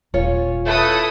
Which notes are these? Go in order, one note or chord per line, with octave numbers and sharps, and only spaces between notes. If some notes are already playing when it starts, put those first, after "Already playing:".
D#1 C#4 F4 C#5
A3 E4 A4 B4 D#6